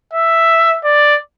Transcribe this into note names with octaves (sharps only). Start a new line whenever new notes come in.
E5
D5